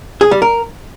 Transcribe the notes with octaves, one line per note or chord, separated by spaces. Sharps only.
G#4
G3
A#4